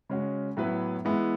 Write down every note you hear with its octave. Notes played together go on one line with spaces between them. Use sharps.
C#3 G#3 C#4 F#4
A2 F#3 B3 E4 B4
E3 G#3 B3 E4